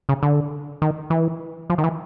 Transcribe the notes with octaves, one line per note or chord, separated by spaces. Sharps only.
C#3
D3
D#3
E3
F3
D#3
E3